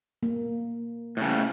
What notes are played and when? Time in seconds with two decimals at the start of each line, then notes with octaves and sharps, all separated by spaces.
0.23 A#3
1.17 A2 C#3